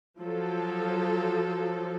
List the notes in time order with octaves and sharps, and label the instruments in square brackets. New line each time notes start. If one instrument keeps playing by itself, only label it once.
[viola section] F3 F#3 A4